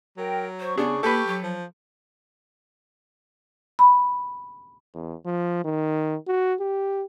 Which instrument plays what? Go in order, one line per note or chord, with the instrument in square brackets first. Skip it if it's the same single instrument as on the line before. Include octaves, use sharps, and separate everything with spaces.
[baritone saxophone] F#3 [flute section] A#4 G5
[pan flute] C5 [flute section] C#6
[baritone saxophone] C#3 [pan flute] B3 [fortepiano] D4 G#4
[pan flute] A#3 [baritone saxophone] G4 [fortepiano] A4 B4
[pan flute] F#3
[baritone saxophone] F3
[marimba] B5
[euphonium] E2
F3
D#3
F#4
G4